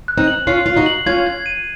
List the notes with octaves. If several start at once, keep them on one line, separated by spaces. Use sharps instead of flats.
F#6
C4 D#4
F#7
C#4 F4 C7
F4 C7
D#4 F#4
F#7
C#4 F4 G#6
G#6
D#7